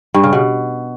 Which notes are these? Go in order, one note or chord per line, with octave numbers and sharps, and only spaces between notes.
G2
C#3
B2